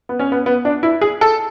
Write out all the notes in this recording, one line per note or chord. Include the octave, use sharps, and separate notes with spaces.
B3
C#4
B3
B3
D4
E4
G#4
A4